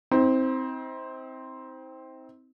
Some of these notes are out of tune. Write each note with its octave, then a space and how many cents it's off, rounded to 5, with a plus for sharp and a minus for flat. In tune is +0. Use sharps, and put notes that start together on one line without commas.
C4 +0 D#4 +45